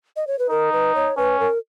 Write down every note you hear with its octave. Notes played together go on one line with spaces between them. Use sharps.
D#5
C#5
B4
D#4 A#4
B4
C#5
C#4 B4
A#4